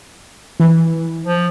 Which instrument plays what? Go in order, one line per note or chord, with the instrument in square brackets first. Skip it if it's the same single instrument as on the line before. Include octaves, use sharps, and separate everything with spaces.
[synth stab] E3
[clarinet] F3